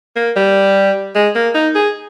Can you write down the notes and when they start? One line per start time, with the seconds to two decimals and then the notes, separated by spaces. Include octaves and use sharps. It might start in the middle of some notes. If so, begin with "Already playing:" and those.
0.16 A#3
0.36 G3
1.15 G#3
1.35 A#3
1.55 D#4
1.75 G#4